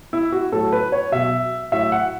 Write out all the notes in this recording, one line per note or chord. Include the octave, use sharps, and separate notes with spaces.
E4
F#4
A2 F#3 A4
B4
C#5
B2 F#3 E5
A2 F#3 E5
F#5